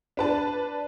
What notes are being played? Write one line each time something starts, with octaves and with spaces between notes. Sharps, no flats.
D4 B4 A5